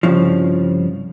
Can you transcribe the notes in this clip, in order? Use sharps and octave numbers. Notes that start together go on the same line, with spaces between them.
C2 G2 C#3 F3